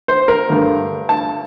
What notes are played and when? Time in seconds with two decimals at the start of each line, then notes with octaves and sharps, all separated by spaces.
0.08 C5
0.28 A#4
0.48 G2 D3 A3
1.09 A5